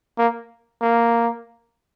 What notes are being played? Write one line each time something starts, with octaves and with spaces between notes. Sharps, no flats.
A#3
A#3